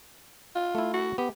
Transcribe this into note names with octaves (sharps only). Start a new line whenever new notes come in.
F4
A3 E4
F#4
B3 G4